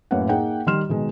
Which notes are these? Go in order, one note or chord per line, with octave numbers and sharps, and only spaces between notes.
F#2 A2 A#3 B4 F#5
A#3 D#4 G#4 F#5 G5
D#3 G3 C6 F6 E7
B2 D#3 G#3